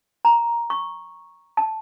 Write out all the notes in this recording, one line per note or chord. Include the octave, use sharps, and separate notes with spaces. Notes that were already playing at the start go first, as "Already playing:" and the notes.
A#5
C#6
A5